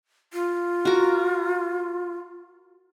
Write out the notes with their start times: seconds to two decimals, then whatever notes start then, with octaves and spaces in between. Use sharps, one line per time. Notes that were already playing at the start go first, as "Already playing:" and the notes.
0.33 F4
0.85 F#4 A#4